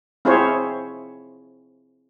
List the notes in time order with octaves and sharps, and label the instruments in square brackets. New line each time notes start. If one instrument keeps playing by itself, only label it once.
[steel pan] C4 E4 F4 G#4 C5 C#5